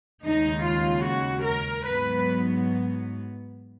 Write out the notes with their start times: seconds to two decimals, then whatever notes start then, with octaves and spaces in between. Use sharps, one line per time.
0.24 D#2 C#3 G#3 D#4
0.64 F4
1.05 F#4
1.46 A#4
1.86 G#2 F#3 B3 B4